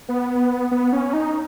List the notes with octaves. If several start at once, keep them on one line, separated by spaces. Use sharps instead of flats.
B3
B3
C#4
D#4